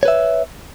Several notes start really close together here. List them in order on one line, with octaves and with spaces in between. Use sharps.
C#5 B4 E5